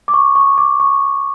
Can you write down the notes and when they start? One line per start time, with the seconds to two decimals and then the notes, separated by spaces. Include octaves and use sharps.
0.08 D6
0.14 C#6
0.36 C#6
0.58 D6
0.80 C#6